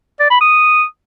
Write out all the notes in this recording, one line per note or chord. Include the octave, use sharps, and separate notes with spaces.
D5
B5
D#6